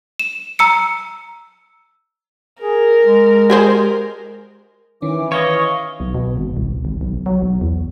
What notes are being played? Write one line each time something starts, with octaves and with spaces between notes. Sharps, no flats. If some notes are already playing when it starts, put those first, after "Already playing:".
E7
A#5 E6 C#7
G#4 A#4
G#3
G4 G#4 C5
D#3 E3 C#4 D6
C#5 D#5 F5 C#6
B1
B2
G#1
C2
G#1
B1
F#3
B1
E2